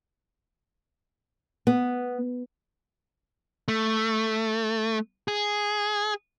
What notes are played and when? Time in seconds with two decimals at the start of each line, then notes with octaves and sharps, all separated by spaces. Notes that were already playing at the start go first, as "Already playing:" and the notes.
1.67 B3
3.68 A3
5.28 G#4